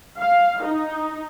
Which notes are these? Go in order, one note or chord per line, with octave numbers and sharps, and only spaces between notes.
F5
D#4